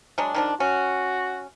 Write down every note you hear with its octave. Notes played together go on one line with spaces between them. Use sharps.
F#3 G#3 D4
D#3 F3 D4
C#4 F#4